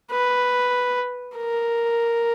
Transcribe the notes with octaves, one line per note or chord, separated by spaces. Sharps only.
B4
A#4